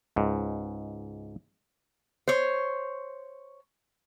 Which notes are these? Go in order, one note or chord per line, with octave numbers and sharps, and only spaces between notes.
C#2 G#2
C5 C#5